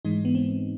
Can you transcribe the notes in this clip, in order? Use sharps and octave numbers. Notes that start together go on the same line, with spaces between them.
G#2 E3 G#3 D#4
B3
C4